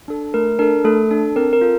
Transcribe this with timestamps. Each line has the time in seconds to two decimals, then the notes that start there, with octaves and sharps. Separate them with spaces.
0.08 D4 A4
0.34 A3 A#4
0.59 D4 A4 A#4
0.85 A3 A4
1.11 D4 A4
1.36 C4 A#4
1.53 A#4
1.61 F4 A4